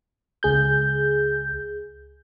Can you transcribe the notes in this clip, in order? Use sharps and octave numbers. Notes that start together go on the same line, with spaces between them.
C#2 G#4 G6